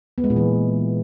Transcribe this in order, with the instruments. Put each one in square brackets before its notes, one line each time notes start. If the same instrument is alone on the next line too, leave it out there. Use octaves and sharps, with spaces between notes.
[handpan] B3
G#3
A#2
E3